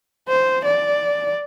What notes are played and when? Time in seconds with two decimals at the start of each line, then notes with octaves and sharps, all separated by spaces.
0.28 C5
0.65 D5